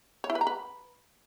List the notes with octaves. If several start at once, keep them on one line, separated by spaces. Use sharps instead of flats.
C#5
E4
B4
A#5
B4